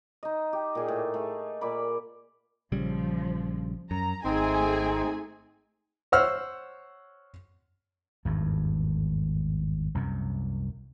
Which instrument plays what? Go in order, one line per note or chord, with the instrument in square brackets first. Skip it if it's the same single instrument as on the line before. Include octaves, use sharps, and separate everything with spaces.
[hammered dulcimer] D#4 D#5
G4
A#2 G#4
A2
A3 G#4
A#2 A#3 D5 B5
[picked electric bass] A#1 C#3 G3 [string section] F3
[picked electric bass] F#2 [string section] A#5
[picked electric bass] G#1 [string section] A3 G#4 G#5 [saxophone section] C4 D#4
[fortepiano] C5 C#5 F#5 E6 F6
[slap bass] G#1 E2 G2
C2 F#2 C3